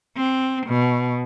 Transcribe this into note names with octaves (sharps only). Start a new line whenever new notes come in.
C4
B2